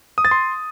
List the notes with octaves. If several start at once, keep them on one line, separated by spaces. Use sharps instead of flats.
D#6
A6
C6